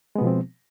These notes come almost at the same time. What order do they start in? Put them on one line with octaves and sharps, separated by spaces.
G#3 B3 B2 F3 C4